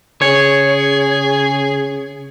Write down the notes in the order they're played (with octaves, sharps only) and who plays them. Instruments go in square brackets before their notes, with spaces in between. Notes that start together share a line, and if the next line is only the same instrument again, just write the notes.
[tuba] C#3 [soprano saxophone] G#4 [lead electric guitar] C#5